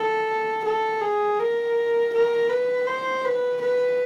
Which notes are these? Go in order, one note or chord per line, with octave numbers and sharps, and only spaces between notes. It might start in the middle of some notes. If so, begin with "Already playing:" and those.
Already playing: A4
A4
G#4
A#4
A#4
B4
C5
B4
B4